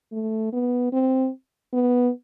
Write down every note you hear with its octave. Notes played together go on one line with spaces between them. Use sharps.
A3
B3
C4
B3